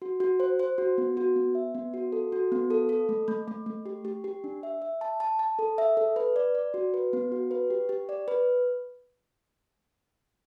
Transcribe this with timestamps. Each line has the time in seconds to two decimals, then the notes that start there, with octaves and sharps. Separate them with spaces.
0.02 F#4
0.20 F#4
0.40 C5
0.59 C5
0.78 F#4
0.98 B3
1.17 F#4
1.36 B3
1.55 E5
1.75 B3
1.94 F#4
2.12 A4
2.32 F#4
2.52 B3
2.70 A4
2.89 A4
3.09 A3
3.28 A3
3.48 A3
3.66 A3
3.86 G4
4.05 G4
4.24 G4
4.44 D4
4.63 E5
4.82 E5
5.01 A5
5.20 A5
5.39 A5
5.59 A4
5.78 E5
5.97 A4
6.16 B4
6.36 D5
6.55 D5
6.74 F#4
6.94 B4
7.13 B3
7.32 F#4
7.51 B4
7.70 G4
7.89 G4
8.09 D5
8.28 B4